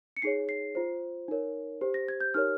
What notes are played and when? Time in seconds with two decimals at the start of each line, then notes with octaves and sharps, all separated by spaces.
0.17 C#7
0.22 D#4 G#4 C#5 C7
0.49 C7
0.75 F4 C5
1.28 D#4 A#4 C#5
1.81 G4 C5
1.94 A#6
2.08 G#6
2.20 G6
2.34 D#4 G4 A#4 C#5 F6